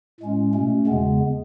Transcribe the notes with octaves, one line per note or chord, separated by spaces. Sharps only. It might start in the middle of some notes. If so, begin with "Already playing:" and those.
A2 G#3 C#4
B2 A3 C#4
E2 C#3 G#3 B3